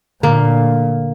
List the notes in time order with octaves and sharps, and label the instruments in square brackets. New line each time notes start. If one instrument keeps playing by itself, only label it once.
[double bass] A#2 [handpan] D3 [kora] A#3